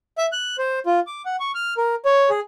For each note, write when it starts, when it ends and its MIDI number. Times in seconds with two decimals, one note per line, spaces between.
0.18 0.26 76
0.32 0.56 90
0.58 0.79 72
0.86 1.00 65
1.07 1.22 86
1.25 1.36 78
1.40 1.52 85
1.55 1.74 89
1.77 1.95 70
2.05 2.29 73
2.30 2.40 68